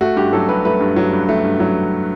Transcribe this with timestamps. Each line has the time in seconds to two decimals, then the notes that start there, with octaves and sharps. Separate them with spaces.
0.01 A3 F#4
0.16 G2 G4
0.33 F#3 A4
0.49 G2 B4
0.65 A3 B4
0.81 G2
0.96 F#3
1.13 G2
1.29 A3
1.44 G2
1.60 F#3